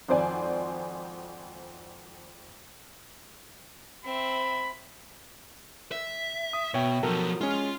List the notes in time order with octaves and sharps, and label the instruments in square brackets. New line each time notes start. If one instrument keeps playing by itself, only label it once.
[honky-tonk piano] G#1 F2 C5 D5 G#5
[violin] C4 E5 [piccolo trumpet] B5
[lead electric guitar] E5
[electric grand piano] D#6
[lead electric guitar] B2 [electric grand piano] C#5 E5 G5
[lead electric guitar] B2 F3 [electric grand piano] F#3 A4 A#4
[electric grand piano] G#3 C#4 [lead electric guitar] F4